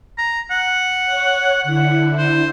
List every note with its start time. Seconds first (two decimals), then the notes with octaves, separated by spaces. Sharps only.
0.18 A#5
0.51 F#5
1.05 C#5
1.63 D3 E4 F#5
2.18 C5